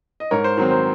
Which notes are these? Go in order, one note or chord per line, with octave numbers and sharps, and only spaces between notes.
D#5
G#2 A#4 C#5
C5
D#3 F#3 C4 A#4
C5